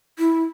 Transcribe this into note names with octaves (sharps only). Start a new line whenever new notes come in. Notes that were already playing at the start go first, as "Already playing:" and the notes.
E4